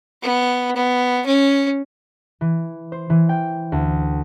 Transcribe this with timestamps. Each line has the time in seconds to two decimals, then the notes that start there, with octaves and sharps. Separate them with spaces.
0.22 B3
0.76 B3
1.26 C#4
2.41 E3
2.92 C5
3.10 E3
3.29 G5
3.72 D2